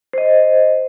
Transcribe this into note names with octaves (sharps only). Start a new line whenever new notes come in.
C5 D#5